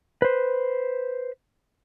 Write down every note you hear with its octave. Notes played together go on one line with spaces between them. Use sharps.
B4 C5